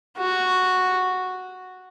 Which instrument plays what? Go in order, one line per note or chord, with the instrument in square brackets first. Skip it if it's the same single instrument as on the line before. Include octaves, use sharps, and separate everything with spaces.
[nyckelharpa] F#4